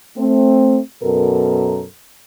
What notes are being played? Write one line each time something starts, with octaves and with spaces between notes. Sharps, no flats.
A3 C4
F#2 B2 A4 A#4